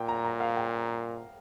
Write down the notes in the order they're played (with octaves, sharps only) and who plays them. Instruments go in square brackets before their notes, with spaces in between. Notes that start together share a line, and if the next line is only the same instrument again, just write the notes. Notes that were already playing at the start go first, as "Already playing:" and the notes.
Already playing: [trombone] A#2 [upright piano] G5
[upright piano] A#5
A#5
F5
G5